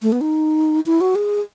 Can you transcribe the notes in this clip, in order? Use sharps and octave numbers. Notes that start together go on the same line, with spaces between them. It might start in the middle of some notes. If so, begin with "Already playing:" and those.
A3
B3
D#4
E4
F#4
G#4